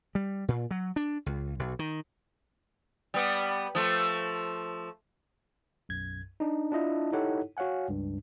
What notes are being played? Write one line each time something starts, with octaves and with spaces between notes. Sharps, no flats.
G3
A#2
F#3
D4
C#2
B1
D#3
G3 B3
F3 A3
B1 F#2 G#6
D4 D#4
D4 E4 F4 D#5 E5 A5
D#4 E4 G4 A4 C#5 F#5
F#4 C#5 F5 F#5 G#5
C#2 G2